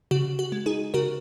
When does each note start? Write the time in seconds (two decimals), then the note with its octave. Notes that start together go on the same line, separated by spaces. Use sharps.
0.11 C#3 F#4
0.39 F#4
0.52 G#3
0.66 D#4 G#4
0.94 C#3 F#4 A#4